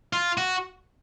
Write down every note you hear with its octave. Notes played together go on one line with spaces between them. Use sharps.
F4
F#4